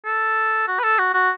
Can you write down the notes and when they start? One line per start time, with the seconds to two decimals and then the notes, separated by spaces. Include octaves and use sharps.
0.06 A4
0.68 F#4
0.79 B4
0.83 A4
0.99 F#4
1.14 F#4